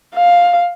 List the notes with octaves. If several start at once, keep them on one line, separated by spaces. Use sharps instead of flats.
F5